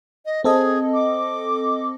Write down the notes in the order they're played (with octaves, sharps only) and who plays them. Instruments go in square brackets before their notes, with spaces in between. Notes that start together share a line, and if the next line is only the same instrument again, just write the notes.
[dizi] D#5
[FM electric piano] C4 A4 D#5 [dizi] G#4
[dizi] D6